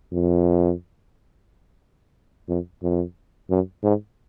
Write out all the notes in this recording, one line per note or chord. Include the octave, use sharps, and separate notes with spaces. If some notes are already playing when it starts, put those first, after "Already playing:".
F2
F2
F2
F#2
G#2